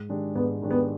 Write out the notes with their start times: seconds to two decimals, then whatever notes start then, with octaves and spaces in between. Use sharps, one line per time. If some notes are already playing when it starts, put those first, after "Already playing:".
Already playing: G#2
0.09 D#3 G#3 D4 G4
0.35 G#2 B3
0.62 D#3 G#3 D4 G4
0.71 B3